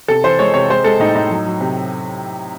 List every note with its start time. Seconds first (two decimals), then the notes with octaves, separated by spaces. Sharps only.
0.08 C3 A4
0.24 E3 C5
0.39 G#3 C#5
0.54 C3 C#5
0.70 G#3 C5
0.84 G#3 A4
0.99 A2 D#4
1.15 A2 D#4
1.30 F#3
1.46 F#3
1.60 C3